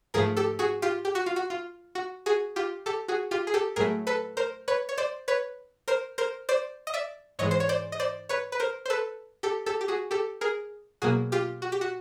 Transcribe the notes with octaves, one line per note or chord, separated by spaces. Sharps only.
G#2 F3 A3 G#4 A#4
G4 A4
F#4 G#4
F4 G4
G4
F#4
F4
F#4
F4
F#4
F#4 G#4
F4 G4
G4 A4
F#4 G#4
F4 G4
G#4
G4 A4
A2 F#3 A3 G#4 A#4
A4 B4
A#4 C5
B4 C#5
C#5
C5 D5
B4 C#5
A#4 C5
A#4 C5
C5 D5
D#5
D5 E5
G#2 E3 G#3 C#5 D#5
C5
C#5
C5 D5
D#5
C5 D5
B4 C#5
B4
A#4 C5
C5
A4 B4
G4 A4
G4 A4
G4
F#4 G#4
G4 A4
G#4 A#4
B2 F#3 A#3 F#4 G#4
F4 G4
F#4
G4
F#4